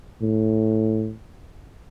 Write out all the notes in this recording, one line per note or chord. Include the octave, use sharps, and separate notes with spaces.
A2